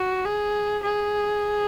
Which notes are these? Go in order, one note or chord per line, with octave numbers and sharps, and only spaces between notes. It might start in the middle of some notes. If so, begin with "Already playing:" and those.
Already playing: F#4
G#4
G#4